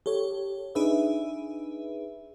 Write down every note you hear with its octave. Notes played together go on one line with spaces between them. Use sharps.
G4 A4 C#5
D4 D#4 G#4 B4 E5